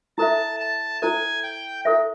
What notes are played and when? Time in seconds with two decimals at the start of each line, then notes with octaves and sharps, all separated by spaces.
0.18 E4 A4 C5 E5 A5
0.60 A5
1.02 E4 A4 C5 E5 G#5
1.43 G5
1.85 E4 A4 C5 E5